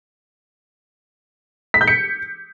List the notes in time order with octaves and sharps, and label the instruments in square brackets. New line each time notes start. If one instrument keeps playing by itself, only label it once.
[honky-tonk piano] B6
G6
C#7